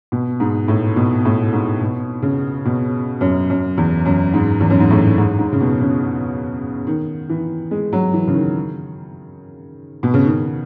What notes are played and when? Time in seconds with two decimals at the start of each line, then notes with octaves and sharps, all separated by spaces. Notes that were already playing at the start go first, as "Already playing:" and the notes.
0.12 B2
0.40 G#2
0.68 A2
0.96 B2
1.25 A2
1.53 G#2
1.81 B2
2.22 C#3
2.66 B2
3.21 F#2
3.50 F#2
3.78 E2
4.05 F#2
4.34 G#2
4.61 E2
4.70 F#2
4.80 G#2
4.90 A2
5.18 G#2
5.39 G#2
5.53 C#3
5.61 B2
5.81 C#3
6.87 D#3
7.29 E3
7.71 G#3
7.93 F#3
8.13 E3
8.28 C#3
8.34 D#3
10.03 B2
10.14 C#3
10.25 D#3